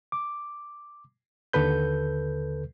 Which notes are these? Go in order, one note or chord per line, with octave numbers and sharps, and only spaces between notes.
D6
D#2 D3 A4 B4 G6